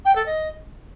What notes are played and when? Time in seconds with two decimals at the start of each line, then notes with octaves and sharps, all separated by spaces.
0.05 G5
0.15 A4
0.26 D#5